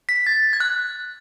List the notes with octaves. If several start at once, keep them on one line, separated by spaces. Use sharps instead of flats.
B6
A6
G#6
F#6